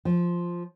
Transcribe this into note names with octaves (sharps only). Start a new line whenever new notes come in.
F3